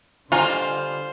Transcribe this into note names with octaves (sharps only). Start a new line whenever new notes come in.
D3 G3 F4 C5 G#5 A#5